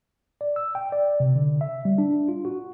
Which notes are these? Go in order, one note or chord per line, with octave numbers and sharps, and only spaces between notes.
D5
E6
G5
D5
C3
D3
E5
G3
D4
F4
F#4